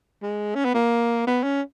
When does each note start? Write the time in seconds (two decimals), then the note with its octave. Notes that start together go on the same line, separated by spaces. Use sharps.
0.23 G#3
0.55 C#4
0.65 B3
0.74 A#3
1.27 B3
1.43 C#4